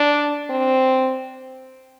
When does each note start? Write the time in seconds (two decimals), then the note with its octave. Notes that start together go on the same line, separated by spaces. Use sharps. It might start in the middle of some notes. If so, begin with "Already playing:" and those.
Already playing: D4
0.50 C4